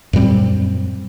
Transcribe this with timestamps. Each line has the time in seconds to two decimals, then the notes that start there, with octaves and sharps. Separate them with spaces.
0.13 F#2 A#2 G3 C4